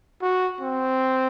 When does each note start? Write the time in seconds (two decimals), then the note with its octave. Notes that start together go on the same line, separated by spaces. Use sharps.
0.22 F#4
0.61 C4